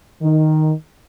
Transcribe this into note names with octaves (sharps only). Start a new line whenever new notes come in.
D#3